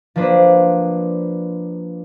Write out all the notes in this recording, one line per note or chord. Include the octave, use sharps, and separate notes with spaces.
F3 A#3 D4 B4 C5